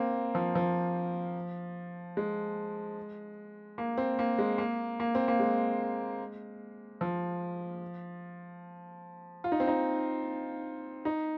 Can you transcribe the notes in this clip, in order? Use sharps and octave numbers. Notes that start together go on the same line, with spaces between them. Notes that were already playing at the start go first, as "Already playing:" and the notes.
Already playing: A#3 C4
F3
F3
G#3
A#3
C4
A#3
G#3
A#3
A#3
C4
A#3
G#3
F3
F4
D#4
C4
D#4
D#4